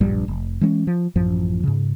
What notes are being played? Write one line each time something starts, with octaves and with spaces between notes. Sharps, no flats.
D1 A#1 G2 G3
F1
E3 G#3 B3 C#4
F3
A1 F#2 F3
G#2 C#3